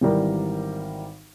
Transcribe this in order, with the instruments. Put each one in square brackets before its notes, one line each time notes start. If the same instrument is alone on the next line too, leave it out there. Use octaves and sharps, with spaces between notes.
[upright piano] G#1 E3 G3 A#4